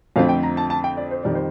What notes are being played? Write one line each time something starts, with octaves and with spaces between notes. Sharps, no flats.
F2 D3 F3 A3 C4 F5
G5
A#5
A5
A5
G5
D5
C5
F2 D#3 G3 D5
C5